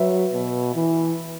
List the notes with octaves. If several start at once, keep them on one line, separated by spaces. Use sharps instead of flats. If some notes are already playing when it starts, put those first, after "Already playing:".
Already playing: F#3 B4 E5
B2
E3